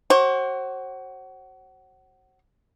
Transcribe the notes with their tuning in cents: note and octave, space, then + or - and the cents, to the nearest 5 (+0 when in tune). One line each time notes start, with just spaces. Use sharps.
F#4 +25 C5 +40